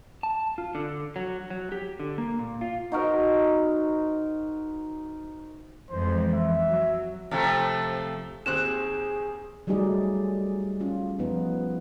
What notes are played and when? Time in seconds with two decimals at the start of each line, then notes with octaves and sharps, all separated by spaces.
0.23 A5
0.58 F4
0.75 D3
1.16 F#3
1.50 F#3
1.72 G4
2.00 D3
2.18 A#3
2.39 A#2
2.61 F4
2.92 D#4 F#4 A#4 C5
5.90 F2 E3 G#3 C5
6.34 E5
6.70 F#3
7.31 C3 F3 A3
8.46 D#2 C4 G#4 F#6 E7
9.67 F#3 G3 A3 D#4 G#4 D5
10.80 C#4 F4
11.19 F3 B3 D#4